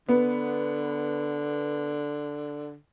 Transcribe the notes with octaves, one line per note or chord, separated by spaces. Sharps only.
D3 B3